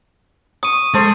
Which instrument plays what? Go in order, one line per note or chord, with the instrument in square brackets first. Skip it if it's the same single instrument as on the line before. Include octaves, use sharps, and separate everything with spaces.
[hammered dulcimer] C#6 [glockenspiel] D#6 D#7
[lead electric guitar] G#3 [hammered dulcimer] A4 C5